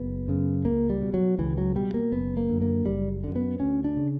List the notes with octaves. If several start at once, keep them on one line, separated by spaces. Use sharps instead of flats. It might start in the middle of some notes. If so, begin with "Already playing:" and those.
Already playing: F#1 B3
F#2 C#3
C#2 A#3
G3
B2
F#3
C#2 E3
F#3
B2 G3
A#3
F#1 B3
A#3
F#2 D3
A#3
F#1 G3
F#2 D3
B3
D2 C#4
D4
C#3